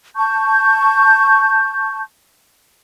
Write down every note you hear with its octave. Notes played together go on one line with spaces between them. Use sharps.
A5 C#6 G6